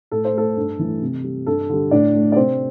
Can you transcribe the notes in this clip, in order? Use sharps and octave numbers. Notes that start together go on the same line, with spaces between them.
A2 A4
C5
A3 A4
G2
E3 A3
C3
G3
G2 A4
D3 G3
A2 D4 D5
A3
D5
C3 C4 C5